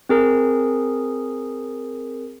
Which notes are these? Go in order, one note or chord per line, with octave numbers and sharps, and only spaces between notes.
C4 G#4 A#4